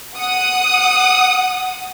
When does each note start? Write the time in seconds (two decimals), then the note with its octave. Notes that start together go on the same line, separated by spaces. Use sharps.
0.16 F#5 D#6